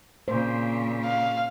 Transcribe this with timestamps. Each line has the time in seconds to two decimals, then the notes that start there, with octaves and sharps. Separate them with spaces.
0.28 A#2 C#3 C5
1.05 F5